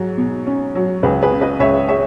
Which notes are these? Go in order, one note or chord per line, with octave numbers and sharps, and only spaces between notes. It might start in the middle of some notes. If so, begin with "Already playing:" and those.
Already playing: G#2 F#3
B2
C#4
F#3
C#2 G#4 B4
G#4 B4
C#3
B4 D#5
C#2 C#5 E5
G#3 C#5 E5